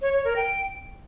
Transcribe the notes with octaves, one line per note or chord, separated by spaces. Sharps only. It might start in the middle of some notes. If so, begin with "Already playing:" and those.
C#5
C#5
A#4
G5